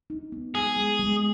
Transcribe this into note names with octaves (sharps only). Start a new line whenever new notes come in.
D#4
B3
G#3 G#4
G#3
G#3